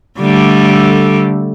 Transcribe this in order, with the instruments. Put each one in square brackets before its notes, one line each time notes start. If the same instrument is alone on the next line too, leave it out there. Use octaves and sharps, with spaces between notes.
[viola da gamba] D3 G3 A3